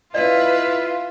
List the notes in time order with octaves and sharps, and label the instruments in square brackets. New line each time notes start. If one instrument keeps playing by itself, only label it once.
[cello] E4 B4 [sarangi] F4 [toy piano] D5 D#5